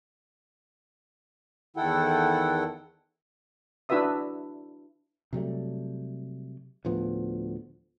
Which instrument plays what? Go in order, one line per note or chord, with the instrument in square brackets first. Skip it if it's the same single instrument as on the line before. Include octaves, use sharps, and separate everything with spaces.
[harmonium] E2 D#3 E4 A4 F#5 G5
[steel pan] D4 E4 F#4 B4 E5 D#6
[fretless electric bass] C3 F#3 G3 A3
D2 A2 F3 B3